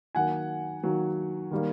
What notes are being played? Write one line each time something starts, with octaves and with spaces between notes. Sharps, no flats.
D#3 F#3 A#3 F#5 G#5
D#3 F#3 A#3
D#3 G3 A#3